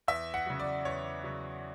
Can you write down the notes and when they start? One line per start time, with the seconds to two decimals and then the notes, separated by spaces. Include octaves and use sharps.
0.08 E2 E5
0.34 F#5
0.46 C#3 F#3
0.59 D5
0.85 E2 C#5
1.24 C#3 F#3